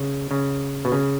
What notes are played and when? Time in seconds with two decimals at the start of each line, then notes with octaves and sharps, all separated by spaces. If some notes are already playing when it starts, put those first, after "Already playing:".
Already playing: C#3
0.31 C#3
0.85 B2
0.92 C#3